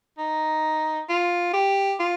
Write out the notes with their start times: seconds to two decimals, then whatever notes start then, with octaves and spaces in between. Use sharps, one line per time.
0.18 D#4
1.09 F4
1.53 G4
1.99 F4